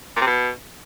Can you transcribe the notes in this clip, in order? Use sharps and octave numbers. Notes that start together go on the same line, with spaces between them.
A#2
C3
B2